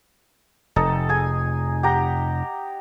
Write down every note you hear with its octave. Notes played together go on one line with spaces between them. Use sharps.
F1 D#4 A4
G#4 G#5
G4 F#5 A#5